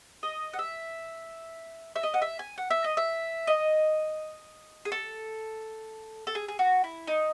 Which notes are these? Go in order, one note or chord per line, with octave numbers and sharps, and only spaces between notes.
D#5
F#5
E5
E5
D#5
F#5
E5
G#5
F#5
E5
D#5
E5
D#5
G#4
A4
A4
G#4
G#4
F#4
E4
D#4